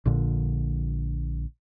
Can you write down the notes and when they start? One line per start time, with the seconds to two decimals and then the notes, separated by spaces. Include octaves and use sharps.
0.05 A#1 A#2 D3